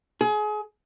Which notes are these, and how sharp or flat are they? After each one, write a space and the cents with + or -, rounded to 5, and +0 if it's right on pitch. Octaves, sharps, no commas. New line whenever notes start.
G#4 +30